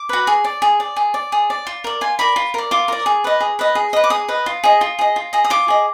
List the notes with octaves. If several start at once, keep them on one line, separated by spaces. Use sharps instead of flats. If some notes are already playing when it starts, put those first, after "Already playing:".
Already playing: D6
F#4 B4
G#4
D5
G#4
D5
G#4
D5
G#4
D5
F4
A#4 D5
F4 G#5
A#4 D5 B5
F4
A#4 D5
F4 D6
A#4 D5
G#4
B4 D#5
G#4
B4 D#5
G#4
B4 D#5
D6
G#4 D#6
B4 D#5
F4
G#4 D#5
F4
G#4 D#5
F4
G#4 D#5
D#6
F4 D6
G#4 D#5